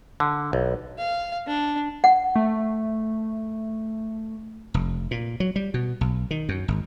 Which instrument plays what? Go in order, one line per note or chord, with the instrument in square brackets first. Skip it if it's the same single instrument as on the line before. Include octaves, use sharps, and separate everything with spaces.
[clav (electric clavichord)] D3
B1
[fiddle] F5
D4
[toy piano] F#5
[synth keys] A3
[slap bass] F1
A#2
F#3
G3
B2
B1
D#3
F#2
G#1